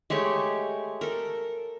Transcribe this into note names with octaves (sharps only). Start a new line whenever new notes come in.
G#3 A3 G4 C#5
A4 A#4